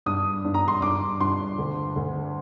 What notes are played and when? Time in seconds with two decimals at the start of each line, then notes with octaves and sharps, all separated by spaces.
0.06 G2 D#6
0.44 G2
0.54 A#5
0.68 C6
0.82 G2 D6
1.20 G2 C6
1.58 D2
1.96 D2